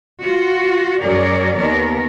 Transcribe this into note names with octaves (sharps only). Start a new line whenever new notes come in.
F4 F#4
F#2 F#3 G#4 A#4 C#5 D5
D#2 D#3 B3 A#4